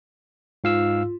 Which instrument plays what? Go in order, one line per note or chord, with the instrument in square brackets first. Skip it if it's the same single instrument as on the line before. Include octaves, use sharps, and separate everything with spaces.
[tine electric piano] G#2 F5 E6 [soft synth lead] F4